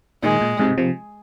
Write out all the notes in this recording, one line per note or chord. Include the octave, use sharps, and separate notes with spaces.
A#2 D#3 G#3
A#2
G#2 C3
C3 F3